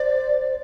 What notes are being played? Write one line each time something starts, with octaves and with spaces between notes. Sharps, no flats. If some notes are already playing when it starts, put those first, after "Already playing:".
Already playing: C5 D5